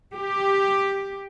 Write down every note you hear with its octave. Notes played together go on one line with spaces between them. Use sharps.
G4